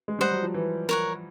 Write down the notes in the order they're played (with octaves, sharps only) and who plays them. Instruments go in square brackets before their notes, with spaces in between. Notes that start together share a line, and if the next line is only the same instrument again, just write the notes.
[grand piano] G#3
[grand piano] G3 [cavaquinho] C5 D#5 F#5
[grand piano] F#3
F3
E3
[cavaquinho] A#4 C#5 F#5